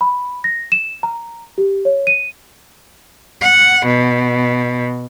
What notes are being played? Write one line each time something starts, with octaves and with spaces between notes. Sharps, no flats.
B5
A#6
E7
A#5
G4
C#5
D#7
F#5
B2